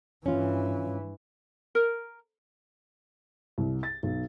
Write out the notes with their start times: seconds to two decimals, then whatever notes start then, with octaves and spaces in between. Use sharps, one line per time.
0.26 G2 E3 C#4 F4
1.75 A#4
3.58 C2
3.83 A6
4.03 B1